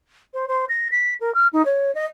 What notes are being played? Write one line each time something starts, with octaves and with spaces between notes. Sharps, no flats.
C5
C5
A#6
B6
A#4
F6
D#4
C#5
D#5